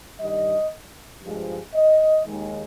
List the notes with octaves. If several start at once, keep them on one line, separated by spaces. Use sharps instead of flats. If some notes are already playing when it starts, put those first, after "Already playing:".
G2 D#3 G3 D#5
G2 F3 G#3
D#5
D#2 D#3 G#3